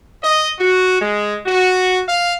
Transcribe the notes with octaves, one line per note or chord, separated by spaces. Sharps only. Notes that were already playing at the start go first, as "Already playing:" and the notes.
D#5
F#4
G#3
F#4
F5